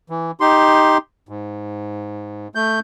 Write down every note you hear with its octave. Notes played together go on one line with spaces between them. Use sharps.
E3
D#4 G4 C6
G#2
A3 G6